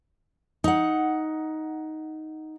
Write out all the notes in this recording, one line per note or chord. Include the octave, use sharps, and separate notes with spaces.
D#4 F#5